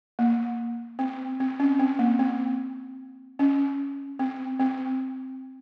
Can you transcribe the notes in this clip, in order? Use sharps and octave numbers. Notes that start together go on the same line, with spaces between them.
A#3
C4
C4
C#4
C4
A#3
C4
C#4
C4
C4